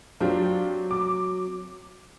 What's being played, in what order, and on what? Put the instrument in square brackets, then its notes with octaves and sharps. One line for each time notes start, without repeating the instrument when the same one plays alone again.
[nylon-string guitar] F#3 C4 [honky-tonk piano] D4 F4 G4
[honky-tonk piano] D6